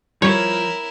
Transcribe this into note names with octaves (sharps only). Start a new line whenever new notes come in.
F3 G3 E4 A#4 C#5